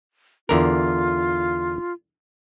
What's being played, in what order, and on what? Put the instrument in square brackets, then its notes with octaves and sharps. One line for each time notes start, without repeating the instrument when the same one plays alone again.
[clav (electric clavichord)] E2 D3 A#4 [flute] F4